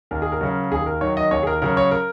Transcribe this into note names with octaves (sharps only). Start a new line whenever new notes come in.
D#2 A#4
G#4
A#4
C#3 F#3
D#2 G#4
A#4
D#3 F#3 C#5
D#5
D#2 C#5
G#4
A#4
C#3 F#3 A#4
C#5
A#4